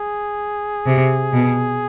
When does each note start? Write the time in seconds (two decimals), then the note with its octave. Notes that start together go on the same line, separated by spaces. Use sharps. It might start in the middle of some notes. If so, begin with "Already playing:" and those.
Already playing: G#4
0.86 C3
1.33 B2